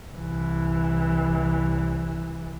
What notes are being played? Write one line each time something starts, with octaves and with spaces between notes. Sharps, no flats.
C2 E3